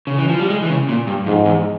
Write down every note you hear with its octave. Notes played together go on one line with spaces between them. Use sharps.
C#3
E3
F3
G3
G#3
E3
C#3
A#2
G2
F2 G#2
E2